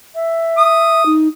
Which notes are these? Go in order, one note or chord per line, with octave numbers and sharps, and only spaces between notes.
E5
D#6
D#4